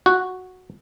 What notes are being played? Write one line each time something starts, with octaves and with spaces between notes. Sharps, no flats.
F#4